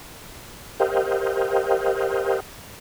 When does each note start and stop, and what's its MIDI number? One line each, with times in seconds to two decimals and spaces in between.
0.80 2.40 67
0.80 2.40 70
0.80 2.40 72
0.80 2.40 75
0.80 2.40 77
0.80 2.40 79